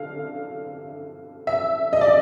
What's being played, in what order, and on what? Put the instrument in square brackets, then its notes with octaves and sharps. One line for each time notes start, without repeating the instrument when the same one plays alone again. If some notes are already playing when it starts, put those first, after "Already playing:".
Already playing: [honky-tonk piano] D3 F5
E5
D#5
D5